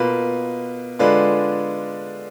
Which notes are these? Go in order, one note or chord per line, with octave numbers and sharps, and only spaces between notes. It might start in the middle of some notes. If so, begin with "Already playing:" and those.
Already playing: B2 A#3 F4 B4
D3 G#3 D4 F4 B4